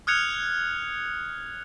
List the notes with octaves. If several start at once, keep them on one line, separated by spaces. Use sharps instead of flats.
D#6 F6 F#6 G#6 C#7 F7